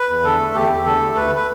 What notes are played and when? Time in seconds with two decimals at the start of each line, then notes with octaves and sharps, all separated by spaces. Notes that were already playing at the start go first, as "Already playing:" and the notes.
Already playing: B4
0.09 E2
0.24 D3 A4
0.39 A3
0.55 E2 G4
0.70 E2
0.85 D3 A4
1.01 A3
1.16 D2 B4
1.35 B4